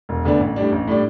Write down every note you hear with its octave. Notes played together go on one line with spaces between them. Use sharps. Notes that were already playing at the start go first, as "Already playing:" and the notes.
E1
D2 D3 B3 D4
A1
A2 G3 D4
A1
A2 G3 D4